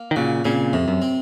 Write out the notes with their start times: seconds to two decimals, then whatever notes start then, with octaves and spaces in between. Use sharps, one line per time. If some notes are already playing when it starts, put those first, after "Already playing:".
Already playing: A#3
0.11 D#3
0.16 A#2 C#3 F#4
0.45 A#2 C#3 C4
0.73 F2 C3
0.88 F#2
1.02 C4